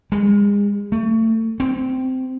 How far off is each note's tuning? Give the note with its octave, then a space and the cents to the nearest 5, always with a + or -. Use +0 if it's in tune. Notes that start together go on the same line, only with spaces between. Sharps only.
G#3 -35
A3 +30
C4 -15